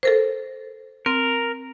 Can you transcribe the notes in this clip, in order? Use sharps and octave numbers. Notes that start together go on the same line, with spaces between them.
A4 A#4 C5
C4 A#4